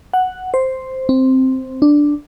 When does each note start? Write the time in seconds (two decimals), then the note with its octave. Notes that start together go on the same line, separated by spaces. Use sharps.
0.13 F#5
0.54 C5
1.09 C4
1.82 D4